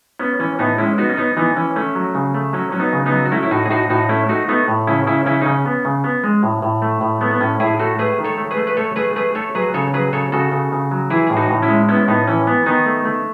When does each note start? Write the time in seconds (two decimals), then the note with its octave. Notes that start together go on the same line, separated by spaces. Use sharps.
0.19 B3 C#4
0.39 E3 C#4
0.59 A2 B3 D#4
0.78 G#3 C#4 E4
0.98 B3 D#4 F#4
1.09 C#4
1.17 B3 D#4
1.37 E3 B3 D#4
1.56 E3 C#4
1.76 A3 C#4
1.95 F#3
2.15 C#3
2.34 A3
2.53 F#3 C#4
2.72 F#3 C#4
2.80 B3 D#4
2.93 C#3
3.06 B3 D#4
3.12 F#3
3.25 F#4
3.32 A3 C#4 E4
3.43 E4
3.51 A2 D#4 F#4
3.66 G#4
3.70 A2 D#4 F#4
3.90 A2 D#4 F#4
4.09 A3 C#4 E4
4.29 A3 D#4 F#4
4.48 A3 B3 D#4
4.68 A2
4.87 C#3 C#4 E4
5.06 C#3 C#4 E4
5.26 C#3 C#4 E4
5.41 D#4
5.45 C#3 C#4
5.66 B3
5.85 C#3
6.04 B3
6.24 G#3
6.43 A2
6.62 A2
6.82 A3
7.01 A2
7.21 A3 B3
7.31 B3
7.41 A2 C#4
7.60 A2 E4 G#4
7.80 A3 F#4 A4
7.99 A3 G#4 B4
8.19 D#3
8.24 A4 C#5
8.38 A3
8.51 G#4 B4
8.57 A3
8.67 B4
8.77 A3 A4 C#5
8.96 A3 G#4 B4
9.16 A3 G#4 B4
9.35 A3 A4 C#5
9.55 F#3 G#4 B4
9.74 C#3 A4 C#5
9.94 F#3 G#4 B4
10.13 C#3 A4 C#5
10.32 C#3 F#4 A4
10.52 C#3
10.72 C#3
10.91 F#3
11.10 E3 E4 G#4
11.27 A2 G#4
11.37 D#4 F#4
11.50 A2
11.62 C#4 E4
11.69 G#3
11.88 B3 C#4 E4
12.08 A2 B3 D#4
12.27 E3 C#4
12.47 B3
12.66 D#3 B3 D#4
12.86 A3
13.05 A3